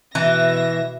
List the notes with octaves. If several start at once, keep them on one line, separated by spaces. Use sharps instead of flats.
B2 E3 E5 A#6